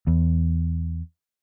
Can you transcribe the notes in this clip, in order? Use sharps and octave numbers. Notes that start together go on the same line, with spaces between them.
E2